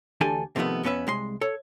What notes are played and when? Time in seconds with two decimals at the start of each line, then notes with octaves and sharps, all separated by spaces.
0.21 D2 E3 D4 G4 A4 G#5
0.56 C3 D#3 F3 A3 B3
0.83 F2 B3 C#4 B4 E5
1.07 C2 G#3 C6
1.41 A4 C#5